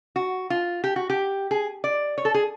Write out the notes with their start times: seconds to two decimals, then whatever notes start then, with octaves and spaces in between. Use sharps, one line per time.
0.16 F#4
0.50 F4
0.84 G4
0.96 F#4
1.10 G4
1.51 G#4
1.84 D5
2.18 C#5
2.25 A4
2.34 G#4